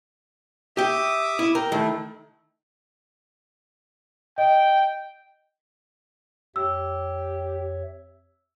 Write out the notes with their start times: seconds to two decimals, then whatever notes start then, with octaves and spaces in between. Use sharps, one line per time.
0.77 G4 E5 G5 D6 D#6
1.39 E4
1.55 A#4 G5
1.72 D#3 A3 E4
4.38 D#5 G5
6.56 F2 G4 C#5 E5 E6